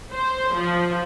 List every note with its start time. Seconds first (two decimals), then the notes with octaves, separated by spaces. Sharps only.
0.12 C5
0.54 F3